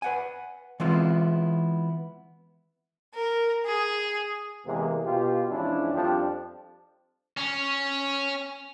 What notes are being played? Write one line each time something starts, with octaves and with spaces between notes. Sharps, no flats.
B4 F#5 G#5
E3 G#3 B3 C4 E4 F4
A#4
G#4
E2 C3 E3 G#3 A#3 C4
B2 F4 G4
E2 G#2 F3 C#4 D4 E4
F2 F3 G3 D4 G4
C#4